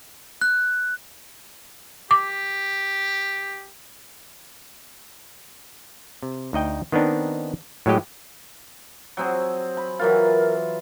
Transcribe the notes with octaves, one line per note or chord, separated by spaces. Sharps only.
F#6
G4 D6
C3
D2 D#4 D#5 G5
D#3 B3 C4 D4 D#4
A2 F#3 G#3 G4 D#5
F#3 C4 G#4
B5
E3 F#3 F4 A#4